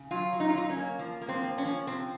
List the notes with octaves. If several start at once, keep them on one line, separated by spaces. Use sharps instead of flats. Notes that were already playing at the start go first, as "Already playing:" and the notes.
Already playing: C#3
F#3 F4
F#3
D#4
F4
F#3 D#4
C#4
A#3
F3
A#3
C4
F3
C#4
F3
C3 C4